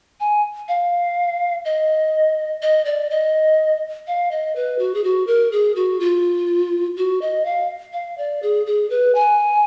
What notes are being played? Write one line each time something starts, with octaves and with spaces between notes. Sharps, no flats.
G#5
F5
D#5
D#5
D5
D#5
F5
D#5
B4
F#4
G#4
F#4
A#4
G#4
F#4
F4
F#4
D#5
F5
F5
D5
G#4
G#4
B4
G#5